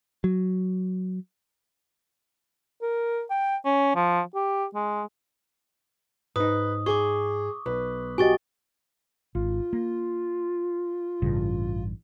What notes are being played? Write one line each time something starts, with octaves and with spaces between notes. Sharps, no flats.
F#3
A#4
G5
C#4
F3
G4
G#3
G#2 D#4 B4 D#6
G#4 C#6 D6
B1 B4
F#4 G4 D#5 G#5 C#6 A6
G#1 F4
A#3
A1 G2 C#3